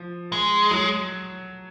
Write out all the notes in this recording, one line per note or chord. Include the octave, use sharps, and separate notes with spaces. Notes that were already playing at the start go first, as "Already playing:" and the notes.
Already playing: F3
G#3
F#3